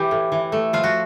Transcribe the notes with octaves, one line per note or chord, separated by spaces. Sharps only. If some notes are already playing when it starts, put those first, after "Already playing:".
Already playing: E3 G4
A2
E3
A3
F3 F4
F#4